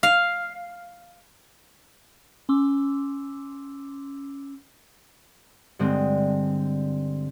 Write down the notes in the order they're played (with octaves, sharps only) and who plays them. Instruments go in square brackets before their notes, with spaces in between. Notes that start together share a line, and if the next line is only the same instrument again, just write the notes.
[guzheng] F5
[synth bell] C#4 C6 D6 E6
[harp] G2 D3 G#3 C4